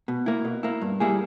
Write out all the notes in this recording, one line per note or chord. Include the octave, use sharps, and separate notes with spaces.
B2
A#3 E4
B2
A#3 E4
G2
G3 A#3 E4 G#4